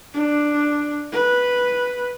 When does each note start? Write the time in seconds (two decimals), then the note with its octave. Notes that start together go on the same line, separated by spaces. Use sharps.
0.14 D4
1.12 B4